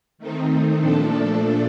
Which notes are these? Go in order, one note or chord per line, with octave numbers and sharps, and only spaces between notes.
D#3 A3 C4 D#4
A#2 F3 A3 D4 A4